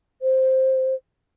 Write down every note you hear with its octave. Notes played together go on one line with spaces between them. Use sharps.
C5